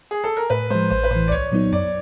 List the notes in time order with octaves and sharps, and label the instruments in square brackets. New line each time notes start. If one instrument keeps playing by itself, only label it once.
[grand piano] G#4
A4
A#4
[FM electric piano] A2 [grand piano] B4
[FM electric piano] F3 G#3 [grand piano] C5
[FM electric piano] A1 [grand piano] C5
[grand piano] B4
[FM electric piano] A2 E3 [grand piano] C5
[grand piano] D5
[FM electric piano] C2 [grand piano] C#5
[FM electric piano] A#2 F#3 B3 D#4
[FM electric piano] F#2 [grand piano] D5